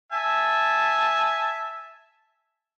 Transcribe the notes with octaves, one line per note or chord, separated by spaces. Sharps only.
E5 G#5 A5